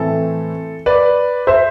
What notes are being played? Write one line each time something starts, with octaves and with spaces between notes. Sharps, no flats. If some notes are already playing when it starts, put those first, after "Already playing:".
Already playing: A2 E3 A3 C4 A4
B4 D5
C5 E5